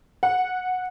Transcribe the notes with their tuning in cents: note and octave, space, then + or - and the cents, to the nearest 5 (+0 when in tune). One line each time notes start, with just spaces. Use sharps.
F#5 -10